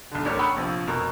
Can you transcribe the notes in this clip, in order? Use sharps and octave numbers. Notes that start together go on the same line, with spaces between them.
B1 D3
A1 D2 D4 G4 A#4 C#5
F#5 G5 B5 C#6 D#6 E6
A#1 C3 F3
F1 B2 A#4 A#5 C#6